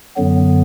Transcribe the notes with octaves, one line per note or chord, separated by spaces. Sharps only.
F#2 D3 F#3 B3